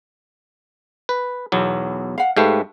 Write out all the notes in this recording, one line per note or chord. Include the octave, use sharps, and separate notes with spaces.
B4
B1 E2 F#3
F5 F#5
G#2 A3 G4 A4 B4 F5